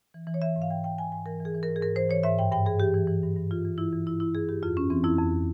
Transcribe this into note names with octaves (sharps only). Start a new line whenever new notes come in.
E3
E3
C#5
E3 E5
G#2
F5
E3 G5
G#2 G5
G#2 G#5
G#2 G#5
E3 A#4
E3
G#4
E3
A#4
G#2
G#4
G#2 A#4
E3 C5
E3 C#5
G#2 E5
G2 G5
G2 G5
G2 G#4
E3 G4
E3
E3
G2
G2
E3 F4
E3
E3 E4
E3
G2 E4
G2 E4
G2 G#4
G2 G4
F2 F4
F2 C#4
E3 C4
F2 E4
F2